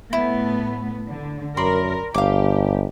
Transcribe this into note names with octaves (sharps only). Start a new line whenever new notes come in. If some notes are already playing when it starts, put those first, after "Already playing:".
A2 A3 B3 E4
D3
F#2 A#4 D5 B5 C6
G1 G4 F5 D6